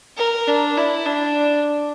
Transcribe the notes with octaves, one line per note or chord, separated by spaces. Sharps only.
A#4
D4
E4
D4